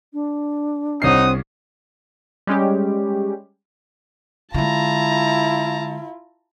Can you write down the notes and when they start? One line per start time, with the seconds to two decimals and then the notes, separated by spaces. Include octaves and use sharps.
0.13 D4
1.02 C2 C4 D#4 C#5 F#5 D#6 C7
2.47 G3 G#3 C#4 G4
4.54 D3 G#3 E4 F4 A5 A#5